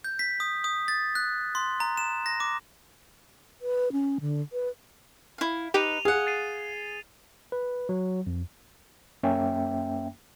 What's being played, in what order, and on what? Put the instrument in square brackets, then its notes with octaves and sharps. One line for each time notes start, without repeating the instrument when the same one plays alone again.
[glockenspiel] G6
B6
D#6
D#6
A6
F#6
C6
A#5
E7
A#6
D6
[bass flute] B4
C#4
D3
B4
[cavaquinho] E4 F5
[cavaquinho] D#4 B4 [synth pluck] G4 [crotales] D#7 F7 G7
[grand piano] G#4 [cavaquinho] F5 F#5
[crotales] A6 C7 D#7
[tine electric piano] B4
F#3
F2
[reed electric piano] F#2 A#3 C#4 E5 G5